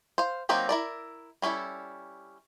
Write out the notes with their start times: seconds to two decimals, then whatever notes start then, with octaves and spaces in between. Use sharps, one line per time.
0.18 C5 F5
0.49 F#3 A#3 C4 D#4 G4
0.69 E4 A#4 D5
1.42 G3 C#4 E4 A4